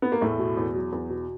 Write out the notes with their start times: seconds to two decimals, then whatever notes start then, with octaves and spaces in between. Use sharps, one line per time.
0.02 B3
0.12 A#3
0.21 E2 A2 A3
0.39 B2
0.57 E2
0.75 F#3
0.92 E2
1.10 B2